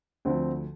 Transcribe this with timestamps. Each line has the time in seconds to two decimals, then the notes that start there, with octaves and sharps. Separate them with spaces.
0.25 D2 D3 F3 C4